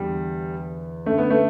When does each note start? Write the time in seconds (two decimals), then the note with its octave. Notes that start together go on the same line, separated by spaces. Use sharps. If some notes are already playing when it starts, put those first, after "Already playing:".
Already playing: E2 D3 G3
1.06 F#2 D3 A3
1.18 B3
1.30 A3